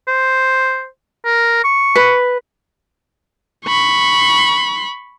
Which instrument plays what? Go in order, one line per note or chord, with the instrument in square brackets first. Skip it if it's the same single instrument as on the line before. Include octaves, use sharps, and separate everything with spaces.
[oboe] C5
A#4
C#6
[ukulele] B4
[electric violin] B5 C#6